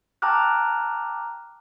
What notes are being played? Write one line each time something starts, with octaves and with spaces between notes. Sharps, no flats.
G5 A5 A#5 D6 F6 F#6